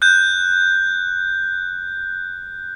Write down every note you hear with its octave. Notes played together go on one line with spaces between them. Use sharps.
F#6 G6